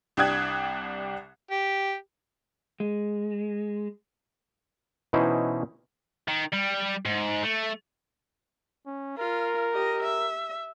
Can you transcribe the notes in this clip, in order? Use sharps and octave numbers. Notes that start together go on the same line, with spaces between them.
C2 D4 G4 D#6 F#6 G#6
G4
G#3
B2 E3 C#4 D#4 E4 C5
D#3
G3
G#2
A3
C#4
F4 A#4
G4 D#5
E5